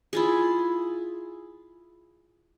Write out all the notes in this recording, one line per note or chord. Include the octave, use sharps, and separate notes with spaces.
E4 F4 G#4